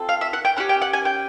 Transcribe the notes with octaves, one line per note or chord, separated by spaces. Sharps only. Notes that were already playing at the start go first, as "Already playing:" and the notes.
Already playing: C4 F4 A4
F5
E5
F#5
G5
C#4 E4 G4 F#5
G5
F#5
G#5
G5